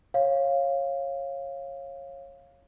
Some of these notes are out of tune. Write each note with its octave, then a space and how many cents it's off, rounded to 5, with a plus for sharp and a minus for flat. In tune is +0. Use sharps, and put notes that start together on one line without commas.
C#5 -20 F5 +0